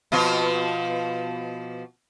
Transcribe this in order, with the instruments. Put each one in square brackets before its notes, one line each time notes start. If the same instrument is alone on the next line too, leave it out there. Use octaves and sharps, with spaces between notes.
[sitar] B2 F3 F4